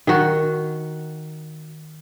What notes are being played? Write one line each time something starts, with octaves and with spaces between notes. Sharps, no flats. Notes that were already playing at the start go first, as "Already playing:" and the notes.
D#3 F#4